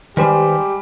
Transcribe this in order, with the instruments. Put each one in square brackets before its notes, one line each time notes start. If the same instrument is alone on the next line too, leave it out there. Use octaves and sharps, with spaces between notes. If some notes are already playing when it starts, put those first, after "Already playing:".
[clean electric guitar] D#3 B4 C5 [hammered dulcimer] G3 G#3 [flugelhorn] G4